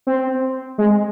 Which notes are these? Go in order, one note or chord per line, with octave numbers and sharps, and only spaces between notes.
C4
G#3